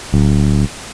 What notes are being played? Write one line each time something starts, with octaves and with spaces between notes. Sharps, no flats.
D1